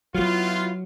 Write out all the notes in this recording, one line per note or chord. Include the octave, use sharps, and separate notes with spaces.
F#3 B3 E4 F4